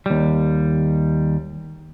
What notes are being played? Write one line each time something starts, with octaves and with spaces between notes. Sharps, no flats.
D#2 G3